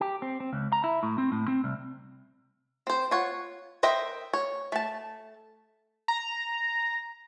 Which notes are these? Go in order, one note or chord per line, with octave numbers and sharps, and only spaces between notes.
G4
C4
C4
C#2
A#5
E4
A2
C4
A2
C4
C2
C4 C5
F4 C#5 F#5
A#4 C5 D#5 E5 G5
C#5
A3 A5
A#5